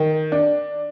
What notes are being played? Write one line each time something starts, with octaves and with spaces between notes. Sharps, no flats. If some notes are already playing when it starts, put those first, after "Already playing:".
Already playing: D#3
D4